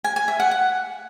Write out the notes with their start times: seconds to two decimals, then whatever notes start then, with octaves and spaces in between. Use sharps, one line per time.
0.04 G#5
0.16 G#5
0.28 E5
0.40 F#5
0.51 F#5